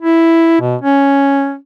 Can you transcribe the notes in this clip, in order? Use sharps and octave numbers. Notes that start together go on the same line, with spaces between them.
E4
B2
C#4